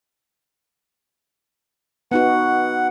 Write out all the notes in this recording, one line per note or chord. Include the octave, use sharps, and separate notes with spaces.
B3 D#4 F#4 F#5